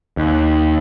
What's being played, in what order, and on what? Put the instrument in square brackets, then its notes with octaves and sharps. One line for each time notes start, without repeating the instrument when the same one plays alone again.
[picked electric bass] D#2